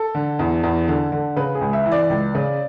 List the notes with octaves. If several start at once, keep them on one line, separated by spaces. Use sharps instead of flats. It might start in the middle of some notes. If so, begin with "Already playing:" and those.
Already playing: A4
D3
E2
E2
D3
D3
C#3 B4
G#4
C#2
E5
E3
D5
C#2
C#3